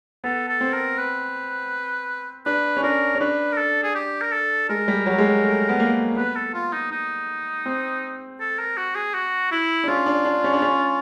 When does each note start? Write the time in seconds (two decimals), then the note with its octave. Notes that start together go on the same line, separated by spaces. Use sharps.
0.24 B3 A4
0.48 A4
0.61 C4
0.73 A#4
0.98 B4
2.46 D4 B4
2.77 C#4
2.83 D4 A#4
3.15 C#4
3.20 D4 B4
3.52 A#4
3.57 A4
3.83 G#4
3.95 G4
4.21 A#4
4.32 A4
4.69 G#3 A#4
4.88 G3
5.06 F#3
5.18 G#3
5.24 G3
5.43 A3
5.69 B3
5.80 A#3
6.17 B3 B4
6.36 A4
6.54 F4
6.73 D#4
6.91 D#4
7.66 C4
8.40 A4
8.59 A#4
8.77 F#4
8.95 G#4
9.14 F#4
9.51 E4
9.84 D4
9.88 C#4 F4
10.06 D4
10.25 D4
10.44 C#4
10.53 D4
10.62 C#4